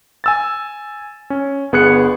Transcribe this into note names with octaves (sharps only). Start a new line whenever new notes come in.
G#5 E6 A6
C#4
G1 B3 G#4 F#6 C#7